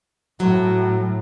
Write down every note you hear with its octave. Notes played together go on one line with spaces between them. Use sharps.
A2 F#3